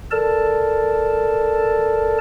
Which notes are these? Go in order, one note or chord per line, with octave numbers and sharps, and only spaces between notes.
A4 A#4 D5 A5